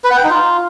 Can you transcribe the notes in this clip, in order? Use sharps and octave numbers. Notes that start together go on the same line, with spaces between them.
B4
F#5
G5
D#4
F4